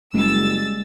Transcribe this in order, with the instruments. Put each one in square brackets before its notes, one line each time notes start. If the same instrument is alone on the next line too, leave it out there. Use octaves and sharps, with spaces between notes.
[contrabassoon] F#1 [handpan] G3 G#3 [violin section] E6 A6